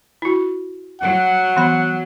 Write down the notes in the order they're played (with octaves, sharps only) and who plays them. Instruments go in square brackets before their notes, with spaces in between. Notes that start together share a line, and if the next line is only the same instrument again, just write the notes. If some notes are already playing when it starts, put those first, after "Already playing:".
[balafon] E4 F#4
[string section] F#3 [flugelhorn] F#5
[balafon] E3 B3 B5